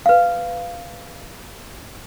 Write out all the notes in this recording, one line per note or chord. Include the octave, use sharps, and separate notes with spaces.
B4 F5